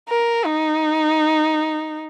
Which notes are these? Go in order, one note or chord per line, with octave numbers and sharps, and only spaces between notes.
A#4
D#4